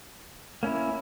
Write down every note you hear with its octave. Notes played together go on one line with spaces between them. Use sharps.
A#3 C#4 E4